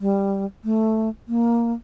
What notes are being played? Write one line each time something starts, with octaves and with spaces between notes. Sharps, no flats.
G3
A3
A#3